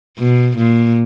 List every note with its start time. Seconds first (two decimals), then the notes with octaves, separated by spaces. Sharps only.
0.18 B2
0.57 A#2